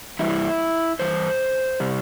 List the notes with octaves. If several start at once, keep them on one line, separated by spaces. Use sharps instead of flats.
G2 E3 G3 E4
G2 E3 C5
C3 G3